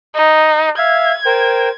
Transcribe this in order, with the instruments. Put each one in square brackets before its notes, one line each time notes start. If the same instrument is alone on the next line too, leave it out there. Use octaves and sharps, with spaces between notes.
[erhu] D#4
[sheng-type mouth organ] E5 F5 [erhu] G#6
[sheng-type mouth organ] A#4 C5 G5